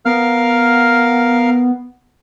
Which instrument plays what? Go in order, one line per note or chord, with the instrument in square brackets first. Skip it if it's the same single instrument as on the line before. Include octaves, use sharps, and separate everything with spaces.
[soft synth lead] B3 [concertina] A#4 F5 F6